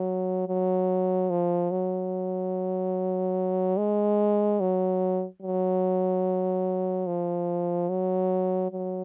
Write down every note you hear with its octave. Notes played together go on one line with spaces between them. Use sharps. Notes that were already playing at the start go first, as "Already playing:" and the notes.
Already playing: F#3
F#3
F3
F#3
G#3
F#3
F#3
F3
F#3
F#3